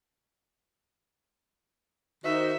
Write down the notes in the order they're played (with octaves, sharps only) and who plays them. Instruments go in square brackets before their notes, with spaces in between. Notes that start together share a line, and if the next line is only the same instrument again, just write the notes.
[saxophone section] D#3 F#4 C5 [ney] D#4 [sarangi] E5